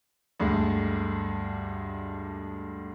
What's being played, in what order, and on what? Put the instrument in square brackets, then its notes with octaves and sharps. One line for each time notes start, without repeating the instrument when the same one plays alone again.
[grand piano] D2 G2 G#3